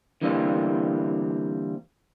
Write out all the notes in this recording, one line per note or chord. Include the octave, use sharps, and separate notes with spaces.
D3 E3 G3 A#3 C4